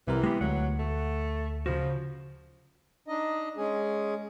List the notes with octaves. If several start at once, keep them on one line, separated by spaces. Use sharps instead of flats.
C2 C3 E3 A#4
G#3 B3 G4
D2 F#3 F#5
A3
C#3 F3 F#4
D4 D#4 D#5
G#3 C#4 G#4